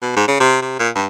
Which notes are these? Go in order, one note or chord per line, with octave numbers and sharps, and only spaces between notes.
B2
G#2
C#3
C3
C3
A#2
G2